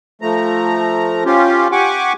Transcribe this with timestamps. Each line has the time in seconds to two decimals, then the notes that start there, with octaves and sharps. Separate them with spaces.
0.22 F3 A3 A#5
1.25 C#4 F4 G4
1.72 G4 F#5 G#5 C#6 D6